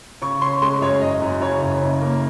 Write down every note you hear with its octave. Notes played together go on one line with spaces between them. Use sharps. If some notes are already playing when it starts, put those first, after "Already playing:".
C#3 C#6
C#4 C6
G#3 C6
F#2 C#5
F#1 D#5
F#2
C#3 C#5
F#1
C#3
A#3